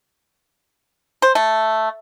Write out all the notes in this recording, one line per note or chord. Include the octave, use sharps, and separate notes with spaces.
C5
A3